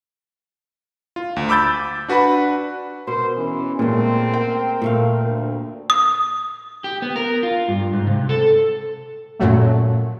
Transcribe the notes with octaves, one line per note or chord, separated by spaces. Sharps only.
F4
D2
B5 D6 E6 G6 A6
D4 F#4 B4 F#5 B5
B2 A#4 C5
E3 C#4
A#2 G#3 A3 C4 A#4
A#4 G5
A#2 A3 F5
D2
D#6
G4
B3
A#4
F4
G2
G#2
C3
A4
F#2 A#2 F#3 A3